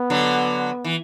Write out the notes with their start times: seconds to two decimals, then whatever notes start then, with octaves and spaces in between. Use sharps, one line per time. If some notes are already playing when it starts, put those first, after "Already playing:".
Already playing: B3
0.10 D3 F#3
0.85 E3